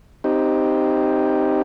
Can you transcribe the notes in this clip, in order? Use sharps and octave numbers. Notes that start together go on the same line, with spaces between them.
C4 D#4 G4